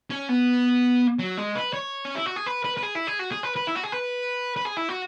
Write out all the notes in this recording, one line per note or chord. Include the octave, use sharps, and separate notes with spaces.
C#4
B3
F#3
G#3
B4
C#5
C#4
E4
F#4
G#4
B4
B4
B4
G#4
E4
G#4
F#4
G#4
B4
B4
E4
F#4
G#4
B4
B4
G#4
E4
F#4